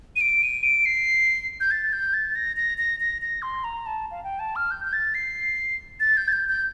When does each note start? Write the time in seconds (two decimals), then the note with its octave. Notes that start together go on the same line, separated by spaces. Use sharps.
0.16 D#7
0.21 D7
0.42 D#7
0.63 D7
0.85 C7
1.60 G6
1.71 A6
1.92 G6
2.13 A6
2.35 A#6
2.56 A#6
2.78 A#6
3.00 A#6
3.22 A#6
3.42 C6
3.64 A#5
3.86 A5
4.11 F5
4.24 G5
4.39 A5
4.56 F6
4.71 G6
4.85 G6
4.93 A6
5.14 C7
6.00 A6
6.17 G6
6.28 A6
6.32 G6
6.48 G6